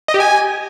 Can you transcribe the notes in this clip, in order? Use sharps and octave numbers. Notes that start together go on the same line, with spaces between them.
D#5
G4
G#5